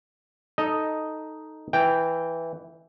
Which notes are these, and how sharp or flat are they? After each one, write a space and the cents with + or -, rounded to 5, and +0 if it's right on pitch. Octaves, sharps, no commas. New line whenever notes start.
D#4 +0 A4 +0 D#5 +0
E3 +0 G5 +0